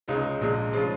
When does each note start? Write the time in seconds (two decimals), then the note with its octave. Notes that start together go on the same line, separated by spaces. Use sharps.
0.08 C#2 C#3 G#3 D#4
0.41 A#1 A#2 G#3
0.73 C#3 F3 G#3 F4